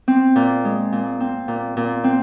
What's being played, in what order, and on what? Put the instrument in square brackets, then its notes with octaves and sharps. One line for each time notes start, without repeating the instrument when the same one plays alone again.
[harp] C4
A#2
G#3
A#2
C4
A#2
A#2
C4